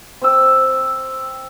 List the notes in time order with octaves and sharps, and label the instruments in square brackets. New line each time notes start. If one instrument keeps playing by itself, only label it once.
[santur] C4 E6